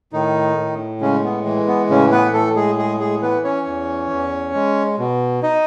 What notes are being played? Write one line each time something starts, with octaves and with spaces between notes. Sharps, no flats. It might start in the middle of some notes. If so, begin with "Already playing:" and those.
A2 D#3 D#4
A2
C#3 G#3 C#4
B3
E3
B3
A2 C#3 C#4
B3 B4
A2 A3 A4
G#3 G#4
G#3 G#4
G#3 G#4
E3 B3 B4
C#4 C#5
E2
E2
G#3
B2
D#4 D#5